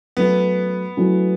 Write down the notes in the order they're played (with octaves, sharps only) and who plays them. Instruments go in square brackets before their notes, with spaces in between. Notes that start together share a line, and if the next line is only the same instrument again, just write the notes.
[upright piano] F#3 A3 C#4 [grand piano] B3
[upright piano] F#3 A3 C#4 E4